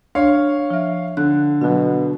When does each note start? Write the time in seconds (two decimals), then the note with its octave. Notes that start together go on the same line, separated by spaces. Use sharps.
0.15 D4 C#5 F5
0.70 F3 E5
1.17 D3 F#6
1.61 B2 F#3 F#4